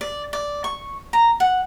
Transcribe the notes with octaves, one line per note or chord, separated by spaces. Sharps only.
D5
D5
C#6
A#5
F#5